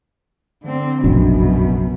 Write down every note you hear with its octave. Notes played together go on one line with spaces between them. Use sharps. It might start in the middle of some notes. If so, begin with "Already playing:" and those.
D3 C4
F1 A#1 F#2 B2 D4